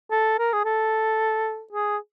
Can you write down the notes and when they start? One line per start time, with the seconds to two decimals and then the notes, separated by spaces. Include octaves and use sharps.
0.11 A4
0.39 A#4
0.53 G#4
0.65 A4
1.72 G#4